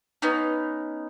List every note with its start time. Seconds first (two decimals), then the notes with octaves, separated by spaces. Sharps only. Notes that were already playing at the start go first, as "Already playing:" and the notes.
0.22 B3 C#4 D#4